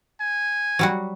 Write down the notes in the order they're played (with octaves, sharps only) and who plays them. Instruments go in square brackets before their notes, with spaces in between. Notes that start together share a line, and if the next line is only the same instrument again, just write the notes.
[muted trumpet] G#5
[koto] F#3 G3 F#4